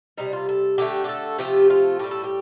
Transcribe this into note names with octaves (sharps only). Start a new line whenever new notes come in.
C3 G3 D#4
F4
A4
D3 A3 G4
G4
A4
C3 F3 A3 G4
F4
A2 G3 G4
A4
G4